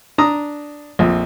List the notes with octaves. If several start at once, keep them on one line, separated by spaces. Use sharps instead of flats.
D4 A#5 D#6
A#1 F2